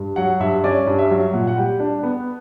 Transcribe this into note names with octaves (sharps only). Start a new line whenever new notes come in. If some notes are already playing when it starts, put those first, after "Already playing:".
Already playing: G2
F#3 F#5
G2 E5
C#4 D5
G2
E5
F#3
A#2 F#5
F#5
G3 G5
D4
B3